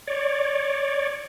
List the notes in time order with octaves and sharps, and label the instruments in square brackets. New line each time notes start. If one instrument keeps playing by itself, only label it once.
[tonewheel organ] C#5 D5